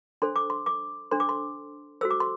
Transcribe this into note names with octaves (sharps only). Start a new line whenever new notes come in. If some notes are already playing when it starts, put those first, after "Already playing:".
D4 A4 C5 C6
D6
C6
D6
D4 A4 C5 C6
D6
C6
F#4 A4 C5 E6
D6
C6